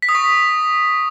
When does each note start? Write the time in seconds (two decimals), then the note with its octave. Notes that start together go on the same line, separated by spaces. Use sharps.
0.02 B6
0.09 D#6
0.15 C#6